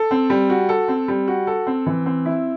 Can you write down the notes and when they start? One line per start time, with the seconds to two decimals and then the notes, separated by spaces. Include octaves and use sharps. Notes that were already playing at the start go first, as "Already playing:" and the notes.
Already playing: A4
0.11 C4
0.30 G3
0.50 F#4
0.69 A4
0.88 C4
1.08 G3
1.28 F#4
1.47 A4
1.67 C4
1.86 E3
2.06 C4
2.25 E4